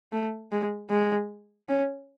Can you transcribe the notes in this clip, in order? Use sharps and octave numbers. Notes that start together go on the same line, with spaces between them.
A3
G#3
G#3
C#4